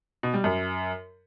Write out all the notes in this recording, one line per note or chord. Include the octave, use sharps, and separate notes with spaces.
B2
G3
F#2